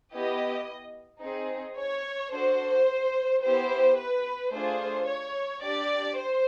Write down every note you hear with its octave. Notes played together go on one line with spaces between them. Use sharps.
B3 E4 G4 D#5
C4 D#4 G#4
C#5
D4 F#4 A4 C5
B3 E4 G4 C5
B4
A3 D4 F4 G#4 C5
C#5
D4 G4 D5
C5